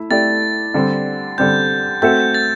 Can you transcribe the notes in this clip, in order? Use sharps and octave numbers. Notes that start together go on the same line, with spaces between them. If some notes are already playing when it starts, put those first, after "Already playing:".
Already playing: A3 E4
A3 E4 G4 D5 A6
D3 G3 C4
D3 G3 C4 G6
A3 C4 F#4 A4 E5 G6
A6